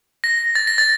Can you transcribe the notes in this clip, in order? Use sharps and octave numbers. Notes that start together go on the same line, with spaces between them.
A#6
A6
A#6
A6